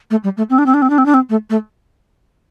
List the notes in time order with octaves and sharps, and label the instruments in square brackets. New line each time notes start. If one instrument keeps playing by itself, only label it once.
[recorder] A3
G3
A3
C4
D4
C4
D4
C4
D4
C4
D4
C4
A3
A3